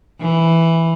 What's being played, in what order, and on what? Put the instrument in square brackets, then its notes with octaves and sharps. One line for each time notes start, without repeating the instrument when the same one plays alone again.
[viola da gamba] E3